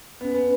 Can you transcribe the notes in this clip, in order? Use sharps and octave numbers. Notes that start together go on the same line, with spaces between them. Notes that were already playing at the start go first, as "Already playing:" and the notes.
B3 C#4
B3